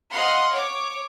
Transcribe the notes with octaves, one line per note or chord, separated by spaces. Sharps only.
D#5 F5 F#5 C6
C#5 D6